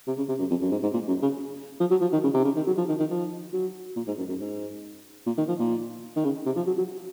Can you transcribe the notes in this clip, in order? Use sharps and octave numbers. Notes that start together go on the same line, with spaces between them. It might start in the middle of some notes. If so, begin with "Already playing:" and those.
C3
C#3
C3
F#2
F2
F#2
G#2
G#2
A#2
F#2
C#3
F3
F#3
F3
D#3
C#3
C3
C#3
D#3
F#3
F3
D#3
D#3
F3
F#3
A#2
G#2
F#2
F#2
G#2
A#2
D#3
F3
A#2
D#3
C#3
C3
F3
F#3
F#3